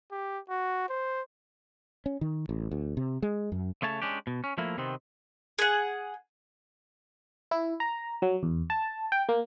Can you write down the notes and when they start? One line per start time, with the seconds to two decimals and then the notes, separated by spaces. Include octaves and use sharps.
0.11 G4
0.50 F#4
0.89 C5
2.06 C#4
2.21 D#3
2.49 A1
2.71 D2
2.97 C3
3.22 G#3
3.52 F#2
3.82 C#3 A3 C#5 A5
4.02 G#3 C#4 D4 G4
4.27 B2
4.44 C#4
4.58 F3 A3 A#3 E4
4.78 C3 D#3 B3 C4
5.59 G#4 F#5
7.51 E4
7.80 A#5
8.22 F#3
8.43 E2
8.70 A5
9.12 G5
9.29 A#3